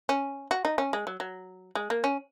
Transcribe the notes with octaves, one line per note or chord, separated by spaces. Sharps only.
C#4
F#4
D#4
C#4
G#3
F#3
F#3
G#3
A#3
C#4